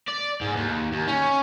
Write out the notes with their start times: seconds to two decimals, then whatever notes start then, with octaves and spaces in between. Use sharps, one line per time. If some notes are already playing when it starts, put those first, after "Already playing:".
0.08 D5
0.41 G#2
0.57 D#2
0.92 D#2
1.08 C#4